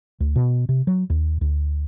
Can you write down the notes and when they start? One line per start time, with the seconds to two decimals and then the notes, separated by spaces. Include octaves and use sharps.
0.20 D2
0.36 B2
0.69 C3
0.87 F#3
1.10 D#2
1.41 D2